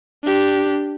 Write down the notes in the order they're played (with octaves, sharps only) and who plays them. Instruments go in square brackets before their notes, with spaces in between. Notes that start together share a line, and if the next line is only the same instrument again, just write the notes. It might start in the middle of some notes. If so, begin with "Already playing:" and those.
[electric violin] D4 G4